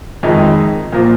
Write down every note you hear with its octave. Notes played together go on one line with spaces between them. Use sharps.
F2 D#3 G#3 D#4
A#2 F3 A#3